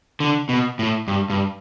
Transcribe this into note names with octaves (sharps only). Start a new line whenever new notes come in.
D3
B2
A2
G2
G2